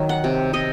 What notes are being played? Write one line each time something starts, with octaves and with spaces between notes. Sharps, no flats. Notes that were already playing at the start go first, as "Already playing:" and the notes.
Already playing: D#3 F#3
F#5
C3
C3 D#5